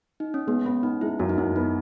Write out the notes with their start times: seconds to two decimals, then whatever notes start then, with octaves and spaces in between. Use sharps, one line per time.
0.20 D#4
0.34 C#4
0.47 G#3 B3
0.66 B3 C#4
0.83 B3 D#4
1.01 G#3 E4
1.20 F#2 F#4
1.29 D#4
1.38 F#2 E4
1.56 B3 D#4